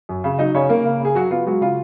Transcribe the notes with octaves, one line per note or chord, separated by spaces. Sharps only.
F#2
C#3
F#3 D#4 D#5
C#3 C#4 C#5
C#3 A#3 A#4
C#3
C#3 G#4
C#3 F#3 F#4
B3 F4
F#3 G#3 F#4
C#3 F4